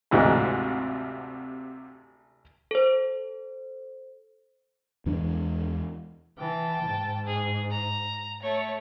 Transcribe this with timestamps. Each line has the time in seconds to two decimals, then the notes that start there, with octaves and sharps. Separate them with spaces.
0.11 A1 D2 G#2 C3 F4 F#4
2.71 A4 C5
5.06 E2 E3 G#3 D4
6.38 E3 G5 A5
6.84 G#2
7.27 G#4
7.71 A#5
8.42 A3 C#5